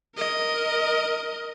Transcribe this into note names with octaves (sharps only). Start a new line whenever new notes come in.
A#4 D#5